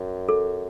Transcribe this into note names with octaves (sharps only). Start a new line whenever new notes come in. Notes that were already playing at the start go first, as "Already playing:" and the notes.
Already playing: F#2
A4